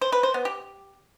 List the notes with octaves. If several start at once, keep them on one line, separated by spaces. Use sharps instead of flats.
C5
B4
C5
B3
G4